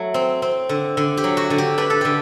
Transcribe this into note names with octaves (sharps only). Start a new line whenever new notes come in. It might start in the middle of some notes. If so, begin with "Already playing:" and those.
Already playing: F#3 A3 E4
C4
C4
D3
D3
G4
F#3
F#4
D3
G4
D4 B4
A4
D3 G4